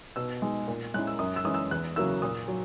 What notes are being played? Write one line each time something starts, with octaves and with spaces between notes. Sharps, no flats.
B2 E6
G#3 D#4
A#2
G#3 C#4 E4 F#6
E6
F#2 D#6
E6
E3 G#3 C#4 E4 D#6
E6
E2 F#6
C#3 F#3 A#3 E4 E6
A#2 D#6
F#3